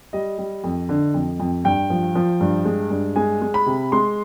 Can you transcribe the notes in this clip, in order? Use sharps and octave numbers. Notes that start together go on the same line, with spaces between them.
G3 D#5
G3
F2
D3
F2
F2
G2 G5
F3
F3
G2
G#3
G2
G#3 G#5
G#3
B5
C3
G#3 C6